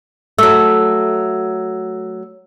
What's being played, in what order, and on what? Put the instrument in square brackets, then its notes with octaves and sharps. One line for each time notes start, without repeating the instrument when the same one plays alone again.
[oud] F#3 A3 [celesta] E6